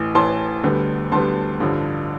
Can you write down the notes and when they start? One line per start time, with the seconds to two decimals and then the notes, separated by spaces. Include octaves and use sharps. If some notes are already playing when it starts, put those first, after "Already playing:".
Already playing: A1 A2 E3
0.15 A1 A2 E3 A5 C6
0.64 D2 D3 G3 B3
1.12 D2 D3 G3 B3 A5 C6
1.60 A1 G2 D3 F3